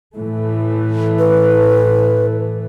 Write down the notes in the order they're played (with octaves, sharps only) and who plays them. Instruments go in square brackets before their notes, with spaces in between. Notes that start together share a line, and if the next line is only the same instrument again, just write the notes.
[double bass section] A2 E3 A3
[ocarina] B4